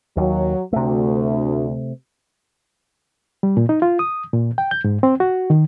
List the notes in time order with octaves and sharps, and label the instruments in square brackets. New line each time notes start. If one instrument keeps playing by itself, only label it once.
[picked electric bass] D#2 [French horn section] F#3
[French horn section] D2 [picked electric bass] C3 A3
[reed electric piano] G3
A#2
D#4
F4
D#6
A#2
G5
G6
G#2
C4
F#4
D#3